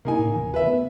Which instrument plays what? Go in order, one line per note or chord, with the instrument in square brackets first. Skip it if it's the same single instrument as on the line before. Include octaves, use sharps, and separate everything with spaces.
[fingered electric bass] C3 [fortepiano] A#3 D#4 G#5
[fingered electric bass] A2
D#1 C3 E3
[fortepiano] B4 E5
[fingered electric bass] A3 B3